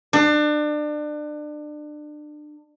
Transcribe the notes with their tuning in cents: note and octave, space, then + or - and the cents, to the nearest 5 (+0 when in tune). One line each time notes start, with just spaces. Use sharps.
D4 +30